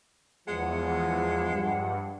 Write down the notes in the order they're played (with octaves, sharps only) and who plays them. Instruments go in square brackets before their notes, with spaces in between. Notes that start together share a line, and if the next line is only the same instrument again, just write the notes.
[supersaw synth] E2 [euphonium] F3 [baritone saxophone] G#3 [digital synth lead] F#5
[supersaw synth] G2